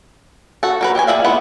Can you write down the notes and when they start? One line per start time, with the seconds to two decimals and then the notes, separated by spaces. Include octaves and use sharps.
0.63 F#4 A4
0.81 F#3 A#4 B4
0.95 G4 D#5 E5 G#5
1.07 G#4 A4 D5 E5 F5
1.24 G#3 B3 E4 F#5